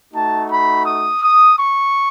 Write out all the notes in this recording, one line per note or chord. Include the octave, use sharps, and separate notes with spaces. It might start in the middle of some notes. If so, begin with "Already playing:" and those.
A3 D#4 F#4 A5
B5
D#6
D#6
C#6